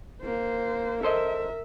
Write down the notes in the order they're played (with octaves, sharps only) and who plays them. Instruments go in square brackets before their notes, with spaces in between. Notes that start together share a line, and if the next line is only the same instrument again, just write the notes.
[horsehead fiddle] A#3 C5
[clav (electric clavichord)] A4 C5 D#5 [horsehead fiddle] A#4 E5